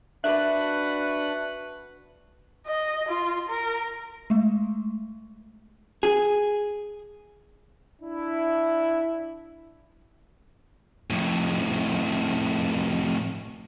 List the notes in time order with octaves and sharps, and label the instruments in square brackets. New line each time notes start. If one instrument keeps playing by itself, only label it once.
[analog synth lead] D4 [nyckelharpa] F#4 B4 [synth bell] E5 F#6 F#7
[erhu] D#5
F4
A#4
[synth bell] G#3 A3
[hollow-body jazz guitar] G#4
[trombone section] D4 E4
[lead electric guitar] F2 A2